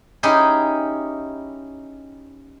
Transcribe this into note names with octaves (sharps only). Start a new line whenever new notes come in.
C#4 D#4 E4 G4 G#4